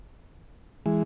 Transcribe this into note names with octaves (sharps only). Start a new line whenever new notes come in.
E3 G#3